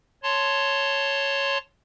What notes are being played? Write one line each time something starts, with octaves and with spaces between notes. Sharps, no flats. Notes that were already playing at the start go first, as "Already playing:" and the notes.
C#5 A5 C6